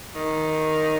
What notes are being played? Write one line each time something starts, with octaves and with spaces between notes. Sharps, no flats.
D#3